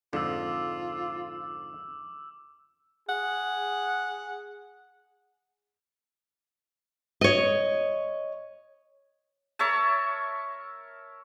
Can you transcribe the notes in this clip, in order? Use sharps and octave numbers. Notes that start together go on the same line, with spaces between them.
F2 G#2 D3 F4 D6 E6
G#4 F#5
C#5 D#5
A#4 C#5 E5 A5